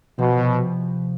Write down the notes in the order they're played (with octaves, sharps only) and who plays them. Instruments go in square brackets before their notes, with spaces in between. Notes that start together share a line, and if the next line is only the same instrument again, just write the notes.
[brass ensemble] B2 [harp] F3
[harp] C3